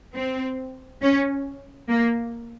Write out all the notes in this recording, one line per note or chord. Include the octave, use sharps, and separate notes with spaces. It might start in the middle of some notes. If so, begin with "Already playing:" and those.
C4
C#4
A#3